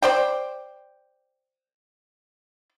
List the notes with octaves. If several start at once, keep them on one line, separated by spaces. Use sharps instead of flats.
C5 D5 G5